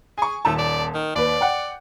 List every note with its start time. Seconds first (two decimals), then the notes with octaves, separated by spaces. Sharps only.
0.18 G#4 G#5 C#6
0.45 D#1 A3 A5
0.58 D5
0.94 D#3
1.15 D#2 B4 D5
1.41 F#5 G5